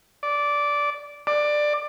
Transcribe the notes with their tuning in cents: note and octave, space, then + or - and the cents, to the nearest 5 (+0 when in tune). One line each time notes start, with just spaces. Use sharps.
D5 -10
D5 +15